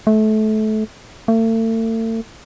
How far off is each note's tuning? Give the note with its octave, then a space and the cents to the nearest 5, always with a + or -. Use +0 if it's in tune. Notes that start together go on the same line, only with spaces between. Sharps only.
A3 -25
A3 +40